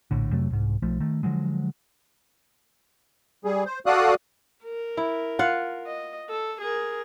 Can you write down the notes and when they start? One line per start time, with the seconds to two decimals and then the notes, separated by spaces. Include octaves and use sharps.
0.11 A#1 A2 D3
0.32 F2 C3 F#3 A3
0.50 C2 G#2
0.82 B1 F3 A3
1.00 D#3 A3
1.23 D3 F3 F#3 G#3
3.45 G3 G#4
3.66 C5
3.86 F#4 A4 D5 F5 D#6 F#6
4.64 A#4
4.97 E4
5.39 F4 F5 F#5
5.86 D#5
6.29 A4
6.61 G#4 A#4